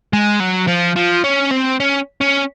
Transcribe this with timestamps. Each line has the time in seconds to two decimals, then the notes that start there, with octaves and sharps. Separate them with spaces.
0.13 G#3
0.40 F#3
0.68 F3
0.96 F3
1.24 C#4
1.51 C4
1.80 C#4
2.21 C#4